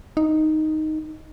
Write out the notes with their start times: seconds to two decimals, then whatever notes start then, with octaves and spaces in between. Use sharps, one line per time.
0.17 D#4